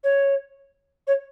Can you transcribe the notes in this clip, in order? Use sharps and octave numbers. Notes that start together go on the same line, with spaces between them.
C#5
C#5